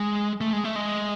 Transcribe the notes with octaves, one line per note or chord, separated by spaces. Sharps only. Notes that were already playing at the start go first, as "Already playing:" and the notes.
Already playing: G#3
A3
G#3
A3
G#3